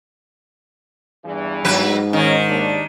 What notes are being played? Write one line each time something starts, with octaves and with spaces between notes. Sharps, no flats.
E2 G2 E3
G#2 F#3 B4
D#3 C#4 D#5
D#2 D4